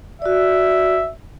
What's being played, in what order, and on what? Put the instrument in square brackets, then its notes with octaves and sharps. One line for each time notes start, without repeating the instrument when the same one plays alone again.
[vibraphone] F#4 D5 [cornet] E5